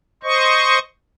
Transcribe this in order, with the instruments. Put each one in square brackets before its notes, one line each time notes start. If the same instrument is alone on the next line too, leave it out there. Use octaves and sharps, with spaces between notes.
[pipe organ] C5 D#5 C#6